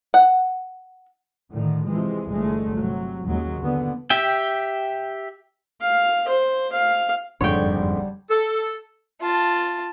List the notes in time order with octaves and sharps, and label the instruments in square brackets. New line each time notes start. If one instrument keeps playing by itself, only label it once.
[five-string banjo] F#5
[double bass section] A2 D3 D#3
C3 E3 F3 G#3
G1 G#3 A3
C3 F#3
D#2 C#3 F#3 G#3
D3 B3
[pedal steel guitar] G4 E5 G5
[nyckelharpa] F5
C5
F5
[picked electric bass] F#1 F2 G#2 [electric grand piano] D3 [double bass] G3 [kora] C#5 G5
[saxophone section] A4
[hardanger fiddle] F4 A5